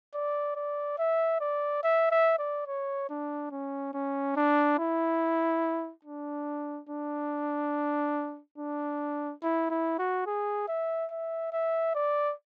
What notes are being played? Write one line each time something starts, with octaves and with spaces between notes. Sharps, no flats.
D5
D5
E5
D5
E5
E5
D5
C#5
D4
C#4
C#4
D4
E4
D4
D4
D4
E4
E4
F#4
G#4
E5
E5
E5
D5